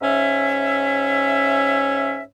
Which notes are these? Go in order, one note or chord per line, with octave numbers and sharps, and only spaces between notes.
G#2 C#4 C#5 E5